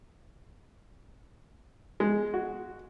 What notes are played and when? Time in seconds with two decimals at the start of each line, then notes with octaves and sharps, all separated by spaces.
2.00 G#3
2.34 F#4